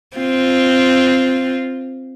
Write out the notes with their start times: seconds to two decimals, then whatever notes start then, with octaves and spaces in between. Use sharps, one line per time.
0.17 C4 F4